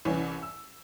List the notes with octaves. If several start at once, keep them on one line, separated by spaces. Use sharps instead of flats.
C2 E3 C#4
E6